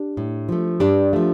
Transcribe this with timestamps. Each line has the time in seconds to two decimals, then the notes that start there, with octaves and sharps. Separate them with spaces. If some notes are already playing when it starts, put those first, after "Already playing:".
Already playing: D4 G4
0.17 A2
0.49 F3 A3
0.80 G2 D4 G4
1.13 F3 A3